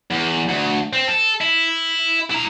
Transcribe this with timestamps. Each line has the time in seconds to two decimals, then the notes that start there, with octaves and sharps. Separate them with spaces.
0.11 E2
0.48 D2
0.93 C4
1.08 A4
1.41 E4
2.30 E4 A#5